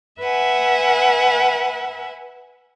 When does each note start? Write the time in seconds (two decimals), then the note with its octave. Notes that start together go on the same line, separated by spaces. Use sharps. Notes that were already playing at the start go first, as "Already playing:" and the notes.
0.20 B4 E5 F#5 G#5